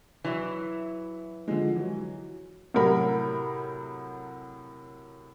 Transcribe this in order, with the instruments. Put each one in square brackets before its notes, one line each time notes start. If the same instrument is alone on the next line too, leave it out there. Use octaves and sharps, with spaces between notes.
[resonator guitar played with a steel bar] E3 F#3 E4
[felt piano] D3 F3 G#3
E3 F#3
[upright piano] A2 C3 F#3 A#4 B5